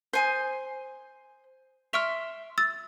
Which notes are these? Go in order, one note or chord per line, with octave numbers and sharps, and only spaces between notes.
C5 G#5 D#6
E5 C6 C#6 F6 D7 F7
E6 A6